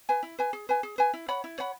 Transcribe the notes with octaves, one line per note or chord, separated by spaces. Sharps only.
B4 G#5
E4
B4 G#5
G#4
B4 G#5
G#4
B4 G#5
E4
C#5 F#5 B5
E4
C#5 F#5 B5